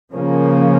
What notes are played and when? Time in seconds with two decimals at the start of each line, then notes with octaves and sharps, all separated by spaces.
0.12 C#3 F3 A#3 C#4